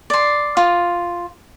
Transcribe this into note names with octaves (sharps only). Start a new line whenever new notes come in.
D5 C6
F4